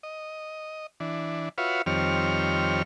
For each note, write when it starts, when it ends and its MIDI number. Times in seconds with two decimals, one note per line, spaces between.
0.03 0.87 75
1.00 1.49 52
1.00 1.49 62
1.58 1.82 65
1.58 1.82 66
1.58 1.82 71
1.58 1.82 73
1.58 1.82 76
1.58 1.82 77
1.86 2.82 41
1.86 2.82 51
1.86 2.82 55
1.86 2.82 60
1.86 2.82 73
1.86 2.82 89